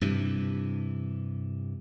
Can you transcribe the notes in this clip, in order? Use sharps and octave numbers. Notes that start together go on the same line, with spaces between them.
G2 C3 E3